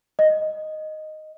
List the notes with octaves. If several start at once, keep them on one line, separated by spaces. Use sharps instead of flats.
D#5